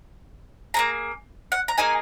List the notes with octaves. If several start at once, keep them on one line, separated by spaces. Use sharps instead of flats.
A#3 C#4 G#4 A#5
F#5
A#5
A#3 D#4 G#4 G#5